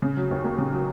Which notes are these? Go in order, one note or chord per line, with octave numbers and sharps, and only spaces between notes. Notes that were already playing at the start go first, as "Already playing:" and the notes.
C#3
F#3
D#2
A#3
C#3
F#3